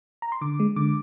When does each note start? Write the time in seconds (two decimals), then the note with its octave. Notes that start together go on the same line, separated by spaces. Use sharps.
0.22 A#5
0.32 C6
0.41 D3 D6
0.60 G#3
0.76 D3 D6